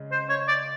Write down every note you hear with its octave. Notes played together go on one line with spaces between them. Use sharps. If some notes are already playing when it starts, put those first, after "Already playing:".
Already playing: C#3 G#3
C5
C#5
D5